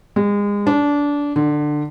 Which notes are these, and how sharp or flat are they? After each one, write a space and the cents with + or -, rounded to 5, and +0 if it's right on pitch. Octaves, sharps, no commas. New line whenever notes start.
G#3 -30
D4 -20
D3 +20